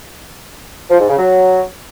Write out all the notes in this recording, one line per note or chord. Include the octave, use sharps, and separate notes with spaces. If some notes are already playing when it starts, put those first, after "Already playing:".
F3
G#2
C#3
F#3